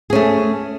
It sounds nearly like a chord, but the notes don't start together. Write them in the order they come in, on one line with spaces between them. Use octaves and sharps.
G#4 C#4 A3